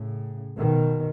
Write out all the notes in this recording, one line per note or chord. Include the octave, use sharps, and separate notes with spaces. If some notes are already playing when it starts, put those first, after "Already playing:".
Already playing: A2 C#3
B2 D#3